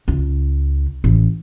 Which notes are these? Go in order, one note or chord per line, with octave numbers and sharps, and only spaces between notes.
C#2
A1